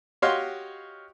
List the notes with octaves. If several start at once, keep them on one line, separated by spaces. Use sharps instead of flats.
F#4 G4 C#5 D#5 F5 C6